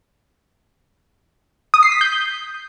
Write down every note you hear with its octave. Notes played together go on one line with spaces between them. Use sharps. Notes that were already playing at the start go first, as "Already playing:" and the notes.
D#6
C7
B6
G6